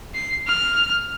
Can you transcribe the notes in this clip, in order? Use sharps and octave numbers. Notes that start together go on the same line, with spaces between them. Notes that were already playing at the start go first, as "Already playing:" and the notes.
C7
F6